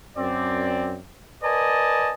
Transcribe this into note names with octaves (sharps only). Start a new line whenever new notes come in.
F#2 C4 D5
A#4 B4 D5 D#5 G#5 A5